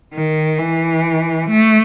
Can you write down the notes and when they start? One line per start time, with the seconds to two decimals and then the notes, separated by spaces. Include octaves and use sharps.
0.14 D#3
0.58 E3
1.50 A3